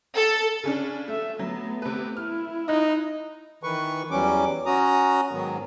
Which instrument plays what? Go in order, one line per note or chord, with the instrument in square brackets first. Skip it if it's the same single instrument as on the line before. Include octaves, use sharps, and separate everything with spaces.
[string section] A4
[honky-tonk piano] C#3 C#4 D4
[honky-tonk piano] A3 [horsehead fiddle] A4 E5
[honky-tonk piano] F#3 [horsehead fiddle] A3 B3
[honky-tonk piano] C3 B4
[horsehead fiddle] E4 [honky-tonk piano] F6
[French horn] D#4 [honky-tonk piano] D#5 F#6
[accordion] D#3 E3 B4 C#6
E2 E3 F#3 G3 C#4 D6
C#4 F#4 A#5 D#6
G#2 D#3 F#3 B3